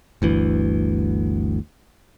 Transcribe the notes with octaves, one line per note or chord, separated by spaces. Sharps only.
G1 D2 E3